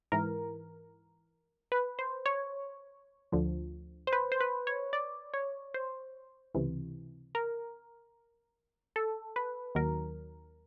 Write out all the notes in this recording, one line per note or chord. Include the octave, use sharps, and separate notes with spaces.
G#2 E3 A#4
B4
C5
C#5
D2 D3 F3
C5
B4
C5
B4
C#5
D5
C#5
C5
C#2 C3 E3
A#4
A4
B4
D#2 D#3 F#3 A#4